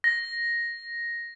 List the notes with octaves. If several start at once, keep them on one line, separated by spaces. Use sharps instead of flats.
A#6